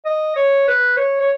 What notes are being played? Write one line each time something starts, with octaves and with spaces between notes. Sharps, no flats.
D#5
C#5
B4
C#5
C#5